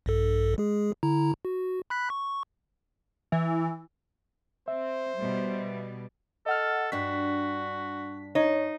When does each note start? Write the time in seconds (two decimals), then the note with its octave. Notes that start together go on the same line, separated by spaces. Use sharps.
0.06 A#1 G2 A4
0.58 G#3 G#4
1.03 D3 E4 A#5
1.45 F#4
1.90 B5 F#6 B6
2.10 C#6
3.32 E3
4.68 C4 C5 E5
5.17 B2 G3
6.46 A4 D#5 F#5 F6
6.92 G2 D4 F#4 B6
8.35 D#4 C#5